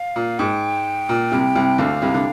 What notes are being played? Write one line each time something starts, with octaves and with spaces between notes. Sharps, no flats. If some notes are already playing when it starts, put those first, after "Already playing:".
Already playing: F5
A#2
G#2 G5
A#2
C2 C3
C2 C3
D2 D3 F5
C2 C3
D3